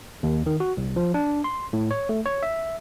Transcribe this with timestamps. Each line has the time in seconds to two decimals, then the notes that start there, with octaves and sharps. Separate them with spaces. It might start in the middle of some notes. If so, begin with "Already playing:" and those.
0.23 D#2
0.46 D#3
0.60 F#4
0.77 C2
0.96 F3
1.14 D4
1.44 C6
1.73 A2
1.91 C#5
2.09 A3
2.26 C#5
2.43 E5